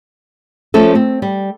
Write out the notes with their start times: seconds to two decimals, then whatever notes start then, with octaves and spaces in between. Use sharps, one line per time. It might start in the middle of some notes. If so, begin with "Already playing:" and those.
0.74 F3 A3 C#4 A4
0.95 C4
1.22 G3